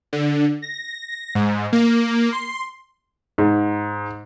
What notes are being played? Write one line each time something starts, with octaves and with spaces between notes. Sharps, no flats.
D3
A#6
G#2
A#3
C6
G#2